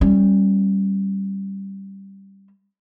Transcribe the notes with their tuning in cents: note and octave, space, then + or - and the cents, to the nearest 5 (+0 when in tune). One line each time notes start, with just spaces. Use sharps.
G3 -5 C#4 -30